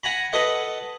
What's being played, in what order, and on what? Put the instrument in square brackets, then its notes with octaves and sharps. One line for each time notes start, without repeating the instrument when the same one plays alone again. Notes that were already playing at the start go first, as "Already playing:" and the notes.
[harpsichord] F#5 G#5 A#5 B5
A4 B4 D#5 F#5